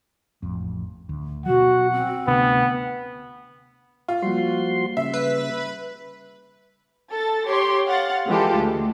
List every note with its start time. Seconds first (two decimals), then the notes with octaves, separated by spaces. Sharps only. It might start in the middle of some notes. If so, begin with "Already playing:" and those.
0.42 A1 F2
1.09 D2
1.46 B2 F#3 F#4 F#5
1.92 C4
2.28 D2 C3 B3 D4
4.08 F4
4.22 F3 G3 A#3 F#4 C6
4.97 C#3 E5
5.14 B4
7.11 A4 A6
7.47 G4 C#5 C6
7.85 F5 F#5 A6
8.26 E3 G#3 F4 G4 A4
8.56 D2